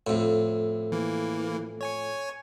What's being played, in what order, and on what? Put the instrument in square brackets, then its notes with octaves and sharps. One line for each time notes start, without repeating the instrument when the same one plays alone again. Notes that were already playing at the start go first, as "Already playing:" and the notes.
[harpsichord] F2 A2
[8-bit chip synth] E3 A#3
C#5 G#5 C#6